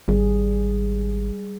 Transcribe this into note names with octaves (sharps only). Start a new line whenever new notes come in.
G#1 G3 G#4